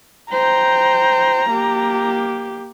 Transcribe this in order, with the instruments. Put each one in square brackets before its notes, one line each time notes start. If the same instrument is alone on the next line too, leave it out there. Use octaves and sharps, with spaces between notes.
[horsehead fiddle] C5 G5 [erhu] A#5
[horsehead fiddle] A#3 G4